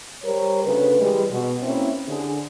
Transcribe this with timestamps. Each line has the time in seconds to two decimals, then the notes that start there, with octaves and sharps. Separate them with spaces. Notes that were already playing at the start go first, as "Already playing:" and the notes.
0.23 G3 A#4 C5 C#5
0.65 D2 C#3 A3 B4
0.99 E3 G3 G#3
1.30 B2
1.62 A#3 C4 C#4 E4
2.07 D3 G#4